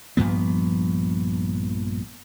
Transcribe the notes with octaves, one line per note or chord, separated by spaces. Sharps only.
A#1 G2 F3 B3